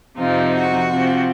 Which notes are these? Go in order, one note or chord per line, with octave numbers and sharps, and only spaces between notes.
F2 C3 F3 C4 D#4 F4
F#4
C3 F3 C4